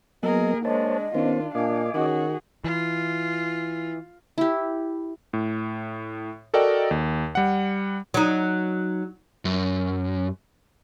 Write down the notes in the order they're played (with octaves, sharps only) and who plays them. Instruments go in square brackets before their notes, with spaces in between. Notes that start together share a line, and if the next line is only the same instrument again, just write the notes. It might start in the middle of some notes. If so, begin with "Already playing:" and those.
[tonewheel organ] F#3 B3 [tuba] A#3 [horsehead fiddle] G#4 A#4 [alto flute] D#5
[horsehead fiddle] G#3 D4 [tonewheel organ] C5 C#5 A5 [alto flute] D#5
[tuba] D#3 [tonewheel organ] B3 C#4 C5 [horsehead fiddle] D4 F4
[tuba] A#2 [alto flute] D4 [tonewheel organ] D#5 G#5 D6 [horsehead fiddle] F5
[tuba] D#3 [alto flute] C#4 [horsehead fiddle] F#4 G#4
[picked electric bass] E3 [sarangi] F4
[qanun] E4 G4
[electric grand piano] A2
F#4 A4 A#4 D5 D#5 G5
D#2
G3 F#5
[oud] F#3 D#4
[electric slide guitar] F#2